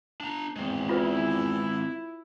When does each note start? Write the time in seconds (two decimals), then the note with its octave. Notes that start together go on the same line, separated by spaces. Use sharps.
0.21 D4 A#5
0.56 E2 G#3 C4
0.89 E4 F4 B4